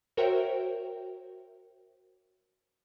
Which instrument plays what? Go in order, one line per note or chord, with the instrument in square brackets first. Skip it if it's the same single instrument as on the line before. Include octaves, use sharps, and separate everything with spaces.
[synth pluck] F#4 A#4 C5 C#5 E5 G5